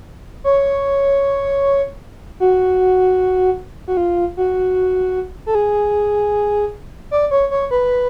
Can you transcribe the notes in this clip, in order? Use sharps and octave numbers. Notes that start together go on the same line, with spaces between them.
C#5
F#4
F#4
F4
F#4
A4
G#4
D5
C#5
C#5
B4